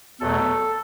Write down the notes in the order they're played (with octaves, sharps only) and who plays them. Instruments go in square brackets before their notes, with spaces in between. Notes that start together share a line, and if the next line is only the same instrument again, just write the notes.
[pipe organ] E2 B2 F#3 A3 A4